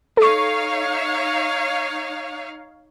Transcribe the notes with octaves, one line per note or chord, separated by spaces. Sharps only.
D#4 A4 C#5 F5 C#6